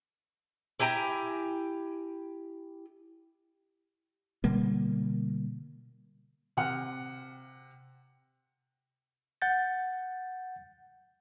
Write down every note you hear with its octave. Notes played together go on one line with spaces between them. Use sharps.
E4 G4 G#5 A#5
B2 D3 G3 A#3
C3 F#5 F6
F#5 G6 A6